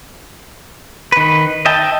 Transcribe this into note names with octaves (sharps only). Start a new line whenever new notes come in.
D#3 B4
D#5 E5 G5 A5